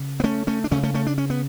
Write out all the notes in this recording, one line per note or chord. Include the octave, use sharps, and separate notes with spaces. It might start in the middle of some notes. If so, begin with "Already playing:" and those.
Already playing: C#3
B3
A3 C#4
A3 C#4
D4
D2 C#3 A3 C#4
A3 C#4
A3 C#4
D4
C#4
B3